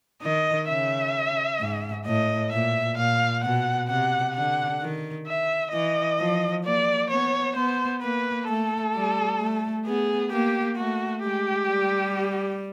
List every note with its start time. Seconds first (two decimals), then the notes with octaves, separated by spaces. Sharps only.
0.22 D#3 D#5
0.68 C#3 E5
1.60 G#2
2.06 A2 D#5
2.52 A#2 E5
2.97 A#2 F5
3.44 B2 F#5
3.89 C3 F#5
4.35 D3 F#5
4.82 D#3
5.26 E5
5.72 E3 D#5
6.19 F3
6.64 A#3 D5
7.10 B3 C#5
7.56 B3 C5
8.02 A#3 B4
8.48 A3 A4
8.94 G3
9.40 A3
9.86 B3 G#4
10.32 A#3 G4
10.77 A3 F#4
11.23 G#3 G4
11.69 G3